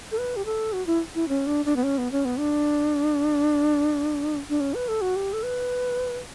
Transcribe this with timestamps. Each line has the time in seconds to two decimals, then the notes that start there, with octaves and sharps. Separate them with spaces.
0.12 A4
0.18 B4
0.36 G4
0.45 A4
0.73 F#4
0.86 E4
1.15 E4
1.29 C#4
1.46 D4
1.65 D4
1.76 B3
1.83 C#4
1.98 B3
2.12 C#4
2.25 B3
2.39 D4
4.49 D4
4.60 C#4
4.74 B4
4.88 A4
5.01 F#4
5.16 G4
5.33 A4
5.43 B4